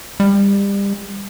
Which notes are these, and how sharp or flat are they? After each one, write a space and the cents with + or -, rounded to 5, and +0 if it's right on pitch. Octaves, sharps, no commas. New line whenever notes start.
G3 +30